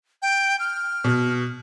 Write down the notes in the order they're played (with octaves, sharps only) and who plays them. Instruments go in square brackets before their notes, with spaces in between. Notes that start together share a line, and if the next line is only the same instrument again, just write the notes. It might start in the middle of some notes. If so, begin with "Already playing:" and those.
[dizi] G5
F6
[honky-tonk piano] B2